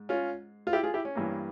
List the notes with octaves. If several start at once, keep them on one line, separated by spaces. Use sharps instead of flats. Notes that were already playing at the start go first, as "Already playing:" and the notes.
Already playing: G#2
C#4 F4
F4
E4 G4
F4 G#4
E4 G4
C#4
G2 E3 A#3